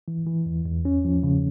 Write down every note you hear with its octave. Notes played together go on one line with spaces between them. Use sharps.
E3
E3
E2
E2
C#4
F3
C#3